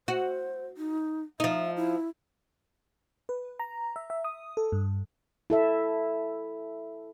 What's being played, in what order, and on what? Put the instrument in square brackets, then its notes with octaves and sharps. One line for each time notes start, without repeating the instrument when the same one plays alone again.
[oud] F#4 [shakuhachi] C5
[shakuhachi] D#4
[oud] F3 D#4 [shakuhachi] E5
[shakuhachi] E4
[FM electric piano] B4
A#5
E5
E5
D#6
A4
G2
[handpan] E4 A4 E5